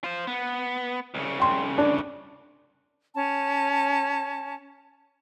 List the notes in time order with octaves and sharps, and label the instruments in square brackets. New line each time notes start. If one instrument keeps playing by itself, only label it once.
[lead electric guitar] F4 C5
B3
C2 C#3
[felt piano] G5 C6
D4
[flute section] C#4 A5